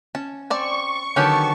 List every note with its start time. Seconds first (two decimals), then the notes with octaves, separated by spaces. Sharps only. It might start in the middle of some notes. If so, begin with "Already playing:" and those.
0.15 C#4 A5
0.50 C4 D5 A5 C#6
1.16 D3 D#3 F#3 B3 C#4 G4 A5